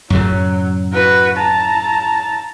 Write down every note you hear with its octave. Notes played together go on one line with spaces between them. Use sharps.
F#2 A2 C#3 F#3
F#4 B4
A5 A#5